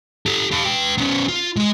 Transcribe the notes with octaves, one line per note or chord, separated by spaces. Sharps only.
G4 A4
G4 F5
B4 G5
B3 C#4
F4
G#3 D#5